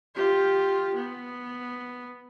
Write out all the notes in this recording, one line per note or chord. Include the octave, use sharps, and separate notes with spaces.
F4 G4
B3